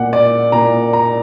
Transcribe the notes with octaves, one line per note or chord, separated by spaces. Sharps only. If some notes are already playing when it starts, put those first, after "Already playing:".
Already playing: A#2 F#5
D5
A#2 A#5
A#5